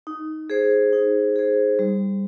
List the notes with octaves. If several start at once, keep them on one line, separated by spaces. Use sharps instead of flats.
D#4
G#4 C5
D#4
G#4 C5
G3